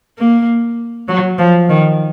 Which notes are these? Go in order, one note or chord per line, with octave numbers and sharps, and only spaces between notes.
A#3
F#3
F3
D#3